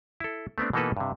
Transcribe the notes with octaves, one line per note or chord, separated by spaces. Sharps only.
E4 A4
A3 B3 C4 D4
B2 E3 A#3 D#4 A4 B4
G2 C3